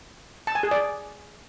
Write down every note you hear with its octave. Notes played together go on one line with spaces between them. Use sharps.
A5
G#5
G#4
D5